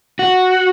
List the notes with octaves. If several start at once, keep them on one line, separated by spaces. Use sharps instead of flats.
F#4